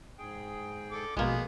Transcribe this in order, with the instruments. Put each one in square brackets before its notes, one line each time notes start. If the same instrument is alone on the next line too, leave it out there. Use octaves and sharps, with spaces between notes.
[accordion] G#2 G#4 G5
[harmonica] A4 D6
[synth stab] A#1 B2 [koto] G#3 A#3 [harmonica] B3 G#4